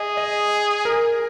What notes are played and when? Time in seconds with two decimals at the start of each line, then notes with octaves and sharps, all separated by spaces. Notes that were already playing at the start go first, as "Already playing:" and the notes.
Already playing: G#4 D#5
0.17 D#5
0.85 A#4